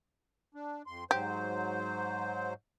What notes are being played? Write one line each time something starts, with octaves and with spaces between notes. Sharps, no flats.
D4
F2 C6
G#2 F#3 G4 C5